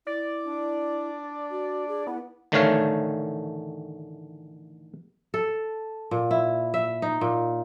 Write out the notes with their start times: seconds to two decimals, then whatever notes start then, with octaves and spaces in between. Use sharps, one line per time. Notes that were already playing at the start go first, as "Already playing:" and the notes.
0.07 E4 D5
0.46 D4
1.50 F#4
1.88 G#4
2.07 B3 E4
2.52 A1 D3 D#3 A3 C#5 F5
5.34 A4
6.11 A#2
6.31 E4
6.74 E5
7.02 D#4
7.21 A#2